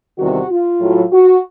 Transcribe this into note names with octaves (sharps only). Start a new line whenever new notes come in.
E2 C3 D#3 G3 F#4
F4
A2 F#3
F#4